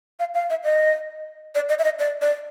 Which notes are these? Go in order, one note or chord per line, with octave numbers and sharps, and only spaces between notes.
F5
F5
E5
D#5
D5
D#5
E5
D#5
D5
D5